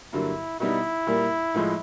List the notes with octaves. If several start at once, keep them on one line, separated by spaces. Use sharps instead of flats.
G2 D3 F#3 A#3 E4
B2 G3 B3 D#4 E4
A#2 G3 A#3
A2 F3 G#3